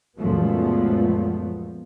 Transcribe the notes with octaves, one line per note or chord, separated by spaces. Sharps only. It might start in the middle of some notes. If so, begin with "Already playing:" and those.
C#2 F#2 A#2 F3 A3 B3